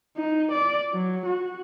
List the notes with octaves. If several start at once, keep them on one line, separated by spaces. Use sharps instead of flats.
D#4
D5
F#3
F#4